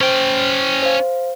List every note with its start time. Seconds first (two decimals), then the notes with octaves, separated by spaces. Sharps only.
0.01 C#4 C5 G5
0.83 C5 F5